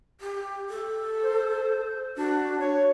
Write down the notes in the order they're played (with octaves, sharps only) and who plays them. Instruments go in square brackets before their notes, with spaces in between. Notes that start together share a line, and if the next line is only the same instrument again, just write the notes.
[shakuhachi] G4
A4
[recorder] C5
[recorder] D4 [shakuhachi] F#4
[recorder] C#5